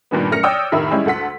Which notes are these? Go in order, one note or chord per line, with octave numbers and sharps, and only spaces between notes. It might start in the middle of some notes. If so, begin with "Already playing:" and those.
G2 A#2 D#3 B3
F#2 A3 A#4 F6 A#6 C#7
C#5 D5 G5 D#6 E6
F1 A2 D#3 A#4 E5
G3 G#3 C#4 E4 G#4
D2 A4 F#5 B6